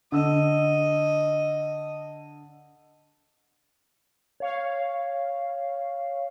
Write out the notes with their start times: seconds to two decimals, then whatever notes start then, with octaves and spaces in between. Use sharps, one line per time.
0.12 D3 D#5 E6
4.40 C#5 F5